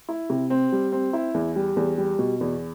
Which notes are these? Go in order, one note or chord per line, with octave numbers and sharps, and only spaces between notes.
E4
C3
C4
G3
C4
E4
E2
G3
E2
G3
B2
E2